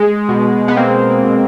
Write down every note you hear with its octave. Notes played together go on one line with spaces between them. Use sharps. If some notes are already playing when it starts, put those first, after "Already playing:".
Already playing: G#3
B2
B3
G#3 A#3 C4
B2